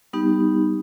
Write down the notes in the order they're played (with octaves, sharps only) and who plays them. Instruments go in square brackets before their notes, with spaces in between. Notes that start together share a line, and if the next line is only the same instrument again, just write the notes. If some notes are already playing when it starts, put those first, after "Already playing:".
[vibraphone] G3 B3 D#4 G4